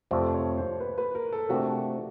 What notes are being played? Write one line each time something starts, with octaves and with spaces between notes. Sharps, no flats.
F2 C3 F3 A3 D5
C#5
C5
B4
B4
A#4
A4
C3 F3 A3 D4 F#4 G4